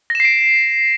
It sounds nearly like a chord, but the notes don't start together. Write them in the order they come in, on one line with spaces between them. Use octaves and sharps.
A#6 E7 C7 D7